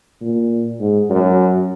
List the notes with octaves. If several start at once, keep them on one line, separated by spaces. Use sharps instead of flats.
A#2
G#2
F#2